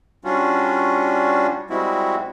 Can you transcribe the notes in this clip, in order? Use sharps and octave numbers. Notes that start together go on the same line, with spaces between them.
G3 C#4 D4 F4 F#4
G3 G#3 C4 E4 F#4